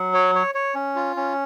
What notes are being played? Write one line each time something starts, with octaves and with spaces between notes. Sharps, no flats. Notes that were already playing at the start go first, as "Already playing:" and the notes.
Already playing: F#3
C#5
C#5
C#5
C#4
F4
C#4